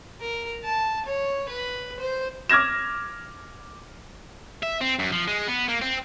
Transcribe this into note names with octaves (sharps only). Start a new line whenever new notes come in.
A#4
A5
C#5
B4
C5
D6 F6 G#6 A#6 E7
E5
C4
F#2
F3
G#3
B3
A#3
C4